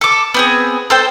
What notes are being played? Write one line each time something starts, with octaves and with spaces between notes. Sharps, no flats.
A4 D6
B3 C4 G#4
A4 C5 G5